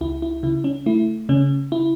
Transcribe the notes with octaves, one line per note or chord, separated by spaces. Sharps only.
C#2 E4
E4
C#3 E4
C#4
A3 E4
C#3 C#4
E4